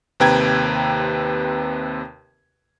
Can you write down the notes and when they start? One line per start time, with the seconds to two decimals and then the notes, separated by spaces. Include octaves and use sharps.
0.20 D#2 C3 B4 G5 A#5 G#6